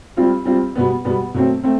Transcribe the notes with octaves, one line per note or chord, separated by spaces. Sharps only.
G3 C4 F4
G3 C4 F4
B2 G3 B3
B2 G3 B3
B2 F#3 A3 C4
A3 C4